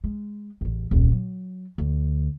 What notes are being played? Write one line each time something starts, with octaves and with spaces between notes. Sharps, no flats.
G#3
A1 E2
D#1 C2
F#3
D2